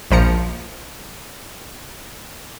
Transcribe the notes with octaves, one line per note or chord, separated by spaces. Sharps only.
A#1 F3 A#5 C#7